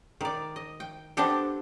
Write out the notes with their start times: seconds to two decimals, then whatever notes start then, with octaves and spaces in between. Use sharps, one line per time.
0.21 D#3 D5
0.56 D#5
0.80 G5
1.17 B3 C4 D4 G4 A4